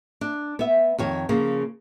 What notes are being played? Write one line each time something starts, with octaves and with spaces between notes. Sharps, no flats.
D4
B3 E5
F2 D#3 C#5
C#3 F3 A#3